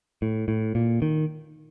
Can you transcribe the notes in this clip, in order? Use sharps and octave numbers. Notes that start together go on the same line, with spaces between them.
A2
A2
A#2
D#3